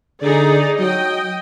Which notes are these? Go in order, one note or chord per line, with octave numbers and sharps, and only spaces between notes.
D3 D#4 G#4 D5
F#3 D#5 G5